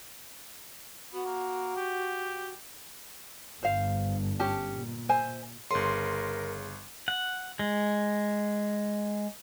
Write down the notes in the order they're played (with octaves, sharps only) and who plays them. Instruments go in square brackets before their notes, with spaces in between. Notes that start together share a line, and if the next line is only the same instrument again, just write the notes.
[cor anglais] B3 [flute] F#4
[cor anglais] A#3
G4
[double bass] G1 G2 [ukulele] C5 F5
[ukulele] C#4 G4 A5
[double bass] A#2
[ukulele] C5 E5 G#5
[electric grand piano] G1 C6 [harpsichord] C#3 [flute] A#4
[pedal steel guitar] F#5
G#3